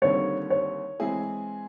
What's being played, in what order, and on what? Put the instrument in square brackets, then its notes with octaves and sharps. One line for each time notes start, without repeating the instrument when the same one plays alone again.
[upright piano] D#2 D3 G3 C4 E4 [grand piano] C#5
[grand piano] C#5
[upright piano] E3 G#3 C4 E4 G#4